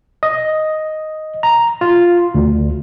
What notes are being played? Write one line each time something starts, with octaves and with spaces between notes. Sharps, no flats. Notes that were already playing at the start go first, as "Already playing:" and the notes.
D#5
A#5
F4
D2